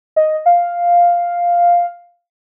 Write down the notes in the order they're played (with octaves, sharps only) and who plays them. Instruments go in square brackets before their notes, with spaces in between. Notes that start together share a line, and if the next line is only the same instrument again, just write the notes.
[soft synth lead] D#5
F5